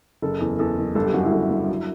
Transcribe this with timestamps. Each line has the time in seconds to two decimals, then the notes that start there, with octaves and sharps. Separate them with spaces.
0.22 F#1 A4
0.40 E2
0.59 E2 A4
0.77 F#1
0.95 G1 A4
1.05 G4
1.14 F#2 F#4
1.23 E4
1.32 G1
1.51 G1
1.68 F#3